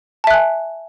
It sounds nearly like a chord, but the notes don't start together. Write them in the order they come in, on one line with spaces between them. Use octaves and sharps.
A5 E5 F#6 G#5